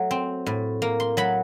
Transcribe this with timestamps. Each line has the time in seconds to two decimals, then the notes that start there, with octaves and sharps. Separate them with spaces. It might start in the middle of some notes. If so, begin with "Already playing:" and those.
Already playing: F#3 A3
0.11 C4
0.46 A2
0.82 A#3
1.00 C6
1.17 F#3 B5